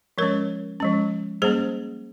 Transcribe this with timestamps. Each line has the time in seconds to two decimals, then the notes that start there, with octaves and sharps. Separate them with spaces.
0.18 F3 G#3 C#4 A#4 C#5
0.80 F3 G#3 C#4
1.42 G3 A#3 C#4 G#4 C5